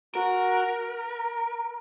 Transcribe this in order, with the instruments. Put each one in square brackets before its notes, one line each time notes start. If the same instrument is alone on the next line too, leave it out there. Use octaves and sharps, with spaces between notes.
[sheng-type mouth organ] F#4 [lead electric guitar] A#4